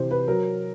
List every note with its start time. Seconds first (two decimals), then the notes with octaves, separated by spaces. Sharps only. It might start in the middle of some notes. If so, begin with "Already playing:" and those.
Already playing: C3 E3 C5
0.11 B4
0.28 F#3 A#4